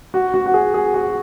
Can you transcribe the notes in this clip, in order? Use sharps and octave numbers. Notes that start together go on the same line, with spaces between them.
F#4
F#4
F#4
G#4
G#4
F#4